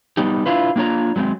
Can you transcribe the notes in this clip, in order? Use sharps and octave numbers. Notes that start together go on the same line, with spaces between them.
G3 B3 D#4 G4
D4 E4 F4 B4
A#3 D4 F4 C#5 A#5
F#3 G#3 B3 C4